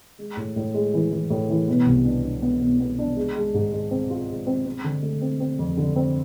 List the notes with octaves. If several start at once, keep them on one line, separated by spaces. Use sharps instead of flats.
G#3
A2
A2
G#3
E3
E3
A2
E3
B2
C2
D4
D4
B3
B2
B3
D4
G#3
G#3
G#2
G#3
C4
F4
G#3
C4
C4
D3
A3
C4
C4
F2
D3
C4